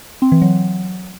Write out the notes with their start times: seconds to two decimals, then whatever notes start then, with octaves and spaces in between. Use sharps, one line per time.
0.22 C4
0.32 E3
0.42 F#3